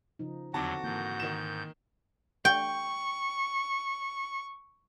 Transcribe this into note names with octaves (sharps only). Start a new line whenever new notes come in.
C#3 F3 D#4
E2 D3 F#3 C4 D#4 F#4 A5 D6
G#2 E3 A#3 G6
D#3 E7
G5 C#6